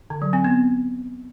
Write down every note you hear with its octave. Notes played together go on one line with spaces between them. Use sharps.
D3
F#3
C4
B3